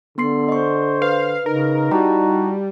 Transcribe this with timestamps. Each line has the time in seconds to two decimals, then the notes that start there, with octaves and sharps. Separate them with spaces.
0.18 D3 B3 C6 C7
0.48 C5 D#5 C#6
1.02 B4 F5
1.46 C#3 D#4 A#4
1.91 G3 E4 F#4 A5 A#5